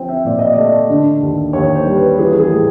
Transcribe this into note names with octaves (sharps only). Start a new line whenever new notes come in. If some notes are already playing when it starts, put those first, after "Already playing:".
Already playing: F3 C4 G5
E5
A#2 D5
D#5
A3 D5
D3
D#2
D#2 C#5
C5
G3
B4
E3 G#4
G#4
A2